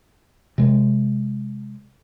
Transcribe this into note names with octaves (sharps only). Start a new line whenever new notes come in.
C3 G#3